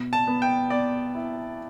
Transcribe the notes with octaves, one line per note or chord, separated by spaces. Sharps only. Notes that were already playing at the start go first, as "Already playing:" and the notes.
Already playing: B2
A5
B3
G5
B3 D5
E4